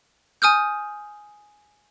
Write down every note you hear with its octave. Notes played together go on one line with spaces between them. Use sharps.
G#5 D#6 F6 G6